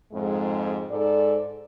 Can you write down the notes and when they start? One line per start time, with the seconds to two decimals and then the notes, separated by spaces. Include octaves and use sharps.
0.12 F2 G#2 G#3
0.90 G#2 A4 D5